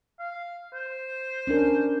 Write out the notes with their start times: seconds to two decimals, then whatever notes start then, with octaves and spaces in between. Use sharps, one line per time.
0.20 F5
0.74 C5
1.47 C#4 D4 A#4